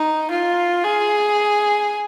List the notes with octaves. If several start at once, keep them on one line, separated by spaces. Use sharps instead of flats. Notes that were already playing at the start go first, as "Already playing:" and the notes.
Already playing: D#4
F4
G#4